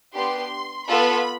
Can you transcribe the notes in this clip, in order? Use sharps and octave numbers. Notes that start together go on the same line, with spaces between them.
B3 D4 G4 C6
B3 F4 A4 B5